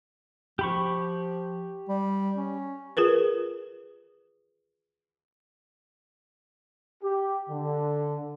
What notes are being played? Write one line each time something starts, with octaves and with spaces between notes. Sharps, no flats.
F3 G4 B5 C#6
G3
C#4
F4 G#4 A#4 B4
G4
D3